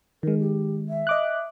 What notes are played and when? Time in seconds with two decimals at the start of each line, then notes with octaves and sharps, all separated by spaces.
0.23 D#3 G#3 A#4
0.40 G4
0.89 E5
1.07 D#5 D6 F#6